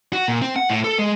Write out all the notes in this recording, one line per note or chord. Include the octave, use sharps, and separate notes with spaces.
F#4
A#2
C4
F#5
A2
A4
G#3